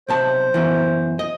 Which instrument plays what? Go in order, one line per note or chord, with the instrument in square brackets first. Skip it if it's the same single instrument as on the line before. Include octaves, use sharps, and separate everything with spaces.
[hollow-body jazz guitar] B1 C3 A5 [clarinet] C5
[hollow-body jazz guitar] F#2 B2 E3
D#5